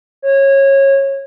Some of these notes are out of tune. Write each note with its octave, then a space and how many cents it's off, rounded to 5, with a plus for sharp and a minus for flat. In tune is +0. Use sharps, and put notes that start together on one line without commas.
C#5 -20